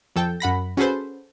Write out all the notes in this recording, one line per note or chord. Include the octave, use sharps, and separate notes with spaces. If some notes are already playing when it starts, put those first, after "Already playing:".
F2 A4 G5 G6
F#2 F#5 B5 A#6
C#4 F#4 G#4 A4 B4 C5